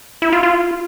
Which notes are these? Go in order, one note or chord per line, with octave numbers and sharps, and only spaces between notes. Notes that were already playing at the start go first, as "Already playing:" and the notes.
E4
F4
F4